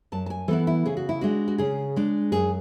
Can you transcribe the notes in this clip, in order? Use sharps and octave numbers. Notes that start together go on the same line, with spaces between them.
F#2 A5
A5
G#5
E3 B3 E4 A4
E4
C#3 G#4
F#4
E4
G#3 D4 F#4
F#4
C#3 G#4
G#3 D4
F#2 G#4